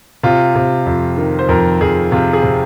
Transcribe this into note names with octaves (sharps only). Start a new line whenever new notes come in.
C3 F4
C3
F2
D#3
C5
F2 A#4
F2 G#4
C3 F4
G#4
C3